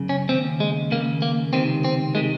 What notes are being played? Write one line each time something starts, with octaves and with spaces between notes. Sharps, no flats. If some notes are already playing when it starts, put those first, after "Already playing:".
Already playing: F#2 C#3
C#4
D#2 C#3 C4
G#3
D#2 C#3 A#3
A#3
C#2 C3 D#3 C4
C4
C3 D#3 G#3